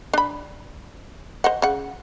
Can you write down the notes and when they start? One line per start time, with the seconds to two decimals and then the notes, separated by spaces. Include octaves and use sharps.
0.14 D4 B5
1.44 C5 D#5 F#5
1.62 C#3 F#5